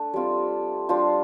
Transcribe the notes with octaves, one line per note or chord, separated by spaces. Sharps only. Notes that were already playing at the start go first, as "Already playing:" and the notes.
Already playing: A3 D4 A4
G3 C4 F4
G3 D4 F4 C5